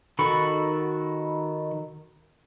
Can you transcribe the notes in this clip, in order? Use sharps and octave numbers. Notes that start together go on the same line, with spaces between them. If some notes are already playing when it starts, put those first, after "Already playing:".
D#3 F#4 A4 B5 C#6